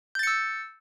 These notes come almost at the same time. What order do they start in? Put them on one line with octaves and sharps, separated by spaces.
G6 A6 C#7 E6